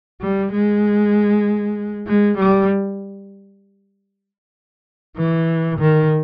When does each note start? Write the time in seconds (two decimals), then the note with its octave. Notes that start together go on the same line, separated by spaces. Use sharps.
0.21 G3
0.52 G#3
2.07 G#3
2.37 G3
5.17 E3
5.79 D#3